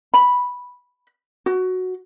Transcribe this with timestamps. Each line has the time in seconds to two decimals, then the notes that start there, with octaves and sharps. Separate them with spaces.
0.14 B5
1.46 F#4